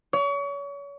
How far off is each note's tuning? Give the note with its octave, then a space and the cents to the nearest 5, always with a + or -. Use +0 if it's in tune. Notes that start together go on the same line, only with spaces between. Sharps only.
C#5 +35